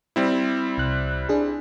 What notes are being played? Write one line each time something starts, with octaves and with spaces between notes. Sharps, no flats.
G3 C4 E4
C2 F#6
D4 G#4